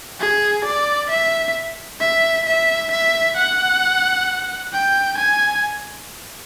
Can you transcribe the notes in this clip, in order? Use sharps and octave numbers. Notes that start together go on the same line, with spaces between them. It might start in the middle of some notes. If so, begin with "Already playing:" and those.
G#4
D5
E5
E5
E5
E5
F#5
G5
G#5